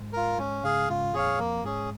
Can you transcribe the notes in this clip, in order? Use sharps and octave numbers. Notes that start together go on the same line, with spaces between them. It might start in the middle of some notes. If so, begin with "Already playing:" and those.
Already playing: G#2
F4 A#4
G#2 C#4
G#2 C#3 G#4 F5
G#2 C#3 F4
F2 A#2 G#4 C#5 F5
F2 A#3
G#2 C#4 G#4